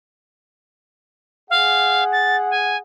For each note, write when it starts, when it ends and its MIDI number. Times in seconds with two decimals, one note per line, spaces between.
1.50 2.82 68
1.50 2.04 77
1.50 2.82 78
2.12 2.36 93
2.50 2.77 80